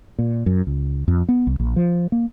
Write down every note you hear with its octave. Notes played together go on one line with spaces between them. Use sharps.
A#2
F#2
C#2
F2
B3
C2
A#1
F3
A#3